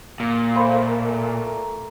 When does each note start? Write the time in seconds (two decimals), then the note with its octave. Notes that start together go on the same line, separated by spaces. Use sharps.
0.20 A#2
0.56 A3 C5 F5 B5 C6
0.87 A#4